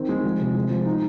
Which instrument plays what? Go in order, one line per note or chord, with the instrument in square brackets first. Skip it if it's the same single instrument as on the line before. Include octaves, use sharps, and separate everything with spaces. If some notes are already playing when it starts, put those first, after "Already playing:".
Already playing: [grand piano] D#3 C4
G#3
F3
C3
G#3
F3
D#4